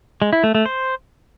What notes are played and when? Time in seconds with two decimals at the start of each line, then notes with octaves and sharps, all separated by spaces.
0.22 G#3
0.33 E4
0.44 A3
0.55 A3
0.66 C5